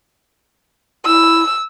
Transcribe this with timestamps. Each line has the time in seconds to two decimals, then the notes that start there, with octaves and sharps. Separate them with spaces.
1.05 E4 E6